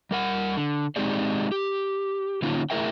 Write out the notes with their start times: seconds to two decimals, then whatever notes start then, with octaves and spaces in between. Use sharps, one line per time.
0.11 G3 A#4 F#5
0.57 D3
0.96 G#3 C4 D#4 G4 G#4 D5
1.52 G4
2.42 D3 A#3 C#4 D#4 F4
2.70 A3 E4 G#4 A#4 E5 G5